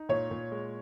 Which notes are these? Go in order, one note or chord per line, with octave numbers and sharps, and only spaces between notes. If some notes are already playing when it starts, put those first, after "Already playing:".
Already playing: D#4
A#2 C#5
A#2
G#3